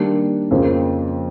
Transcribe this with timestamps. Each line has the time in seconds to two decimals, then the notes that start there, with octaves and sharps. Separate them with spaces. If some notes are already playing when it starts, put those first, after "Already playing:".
Already playing: D#3 G3 A#3 D4
0.51 F2 C#3 F3 A#3